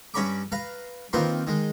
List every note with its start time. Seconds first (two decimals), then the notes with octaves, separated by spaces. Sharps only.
0.14 G2 C#4 C#5 A#5 B5 D6
0.52 B4 F5 A#5
1.13 D#3 A#3 C4 F4 A#4 B4
1.47 D#3 G#3